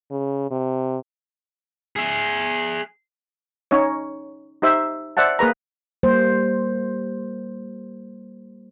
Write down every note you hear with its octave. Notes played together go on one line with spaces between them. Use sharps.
C#3
C3
G#4 E5
C#4 D#4 C#5
D#4 G4 C5 E5
C5 D5 E5 F#5 A5
A#3 G#4 B4 A#5
G3 A#3 C5